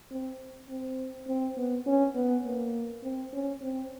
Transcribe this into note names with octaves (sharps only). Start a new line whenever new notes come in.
C4
C4
C4
B3
C#4
B3
A#3
C4
C#4
C4